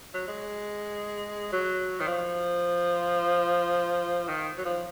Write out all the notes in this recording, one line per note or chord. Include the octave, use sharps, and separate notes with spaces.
F#3
G#3
F#3
D#3
F3
D#3
F#3
F3